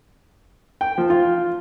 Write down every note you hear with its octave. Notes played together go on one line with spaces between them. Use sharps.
G5
F3
F4